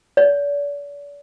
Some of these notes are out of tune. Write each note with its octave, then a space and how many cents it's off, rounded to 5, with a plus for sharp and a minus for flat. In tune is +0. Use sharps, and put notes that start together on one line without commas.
D5 -40